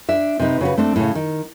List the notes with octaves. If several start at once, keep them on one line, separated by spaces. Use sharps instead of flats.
D4 E5
C3 C4 D#4 B4
C#3 F#4 B4
A3 C4 D4
A2 C#3
D#3